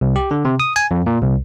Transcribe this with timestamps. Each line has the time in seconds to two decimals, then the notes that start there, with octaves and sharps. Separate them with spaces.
0.01 C2
0.16 G4
0.31 D3
0.45 C3
0.60 D#6
0.76 G#5
0.91 F2
1.06 A#2
1.23 C2